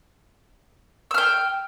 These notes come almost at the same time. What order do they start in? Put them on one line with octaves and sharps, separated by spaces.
E6 F6 G5